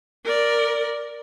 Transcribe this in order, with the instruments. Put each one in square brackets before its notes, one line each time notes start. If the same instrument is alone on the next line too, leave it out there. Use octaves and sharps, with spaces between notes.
[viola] A#4 D5